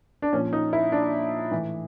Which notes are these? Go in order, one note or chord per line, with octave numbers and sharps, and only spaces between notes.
D4
A#2 F3 C#4
D#4
E4
D4
A2 E3